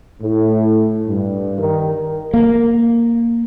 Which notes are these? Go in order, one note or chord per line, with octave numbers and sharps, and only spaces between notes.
A2
G2
D#3
A#3